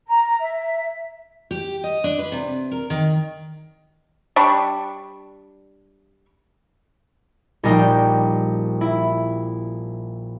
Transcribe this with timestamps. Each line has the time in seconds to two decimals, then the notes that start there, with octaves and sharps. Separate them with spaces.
0.08 A#5
0.41 E5
1.51 G4
1.84 D#5
2.04 D4
2.19 B4
2.32 C3
2.72 A#4
2.90 D#3
4.36 G3 D4 C#6
7.63 A#1 G3 A#3 D#4 G5
8.81 E4